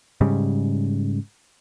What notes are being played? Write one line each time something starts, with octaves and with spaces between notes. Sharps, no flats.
G#2 C#3 G3